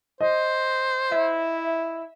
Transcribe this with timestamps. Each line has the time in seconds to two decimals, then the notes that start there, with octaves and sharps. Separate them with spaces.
0.21 C5 D#5
1.12 E4 E5